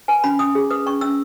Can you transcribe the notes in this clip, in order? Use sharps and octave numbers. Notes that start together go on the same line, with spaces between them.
B4 G#5
C#4 B5
C#4 D#6
G#4
B4 D#6
C#4 C#6
C#4 E6